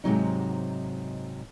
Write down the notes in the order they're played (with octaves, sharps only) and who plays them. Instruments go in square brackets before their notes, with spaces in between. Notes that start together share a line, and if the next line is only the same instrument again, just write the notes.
[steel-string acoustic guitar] G#2 C3 F#3 D#4